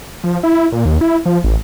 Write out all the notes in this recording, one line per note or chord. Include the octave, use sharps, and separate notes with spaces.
F3
E4
A#2
D#2
E4
F3
A1